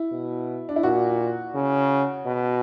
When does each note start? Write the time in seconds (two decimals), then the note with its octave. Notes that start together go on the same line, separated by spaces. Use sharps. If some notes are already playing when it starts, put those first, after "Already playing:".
Already playing: E4
0.12 B2
0.69 D4
0.76 E4
0.83 A#2 F#4
1.55 C#3
2.26 B2